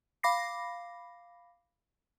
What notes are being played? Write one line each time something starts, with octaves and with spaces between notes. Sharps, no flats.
F5 B5 D6 A#6 C7